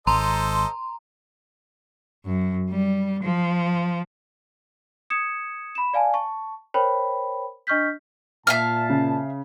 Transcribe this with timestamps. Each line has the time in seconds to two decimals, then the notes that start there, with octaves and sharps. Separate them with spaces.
0.07 G#1 A4 C5 D#5 A#5 C6
2.26 F#2
2.71 G3
3.23 F3
5.10 D#6 G#6 C#7 E7
5.75 B5 E7
5.93 D5 F5 G#5 A5
6.14 A5 C#6
6.74 A#4 C5 C#5 G5 B5
7.67 D4 D#5 C#6 F6 G6 B6
8.47 A#2 E5 F5 A5 F6
8.89 C#3